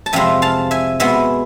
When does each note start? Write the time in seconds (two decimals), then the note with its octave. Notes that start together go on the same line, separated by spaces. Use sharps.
0.06 A5
0.13 F2 C3 G#3 E5 G#5
0.42 F5 A5
0.71 E5 G#5
1.00 B2 G#3 B3 E5 G#5